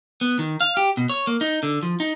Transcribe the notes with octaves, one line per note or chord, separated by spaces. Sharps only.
B3
D#3
F5
G4
B2
C#5
A#3
D#4
D3
F3
D#4